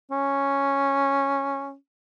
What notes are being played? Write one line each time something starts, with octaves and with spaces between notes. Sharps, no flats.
C#4